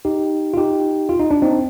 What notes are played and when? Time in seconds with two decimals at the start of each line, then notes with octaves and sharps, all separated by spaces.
0.05 D#4 G4
0.54 F4
0.57 D#4 G4
1.09 F4
1.20 D#4
1.31 D4
1.42 C4 D#4